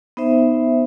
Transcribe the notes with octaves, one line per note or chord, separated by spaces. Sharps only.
B3 D#4 C5 E5